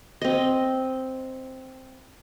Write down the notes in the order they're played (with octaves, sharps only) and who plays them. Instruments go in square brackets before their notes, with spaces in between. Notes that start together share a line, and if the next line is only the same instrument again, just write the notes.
[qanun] C4 D#5